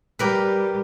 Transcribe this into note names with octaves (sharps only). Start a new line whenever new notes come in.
G3 G4 A#4 B4